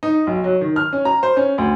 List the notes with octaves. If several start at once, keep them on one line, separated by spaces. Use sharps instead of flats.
D#4
B1
F#3
D#3
F6
C#4
A#5
C5
C#4
D2